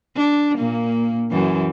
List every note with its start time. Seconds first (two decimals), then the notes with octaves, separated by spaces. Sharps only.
0.16 D4
0.58 A#2 A#3
1.31 F#2 E3